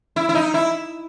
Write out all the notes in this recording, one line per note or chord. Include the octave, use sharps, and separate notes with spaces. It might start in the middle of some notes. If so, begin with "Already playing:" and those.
E4
E4
D#4
E4